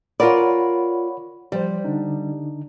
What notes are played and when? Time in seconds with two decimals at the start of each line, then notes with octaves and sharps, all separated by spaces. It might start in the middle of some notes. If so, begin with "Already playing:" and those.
0.20 F4 A#4 C#5 D5 F#5 B5
1.52 F3 G3 C5
1.85 D3 D4 D#4